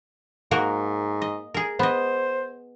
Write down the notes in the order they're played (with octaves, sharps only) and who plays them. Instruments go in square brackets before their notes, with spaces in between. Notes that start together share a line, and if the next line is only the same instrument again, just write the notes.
[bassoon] G#2 [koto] A#3 F#4 A#4
[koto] D#5
G#4 A#4
[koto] B3 D#5 [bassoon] C5